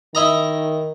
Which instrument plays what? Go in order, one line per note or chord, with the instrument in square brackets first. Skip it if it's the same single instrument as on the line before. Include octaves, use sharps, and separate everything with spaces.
[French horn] D#3 [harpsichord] E4 D#5 A#5